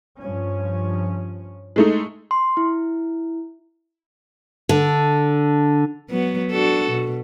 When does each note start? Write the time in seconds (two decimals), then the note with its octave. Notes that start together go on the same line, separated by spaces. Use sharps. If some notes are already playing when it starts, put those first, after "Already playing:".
0.20 G2 F3 C#4
1.76 G#3 A3 D#4
2.31 C6
2.57 E4
4.69 D3
6.10 F#3 B3
6.51 D4 F#4 A4
6.91 B2